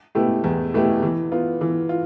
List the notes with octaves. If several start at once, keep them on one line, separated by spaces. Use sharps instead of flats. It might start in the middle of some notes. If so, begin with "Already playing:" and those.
B2 A3 E4 G4
E2
B2 A3 E4 G4
E3
B3 F4
E3
F4